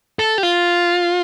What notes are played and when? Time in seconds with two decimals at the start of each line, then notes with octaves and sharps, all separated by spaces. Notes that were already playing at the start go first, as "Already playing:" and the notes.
0.19 A4
0.38 G4
0.43 F4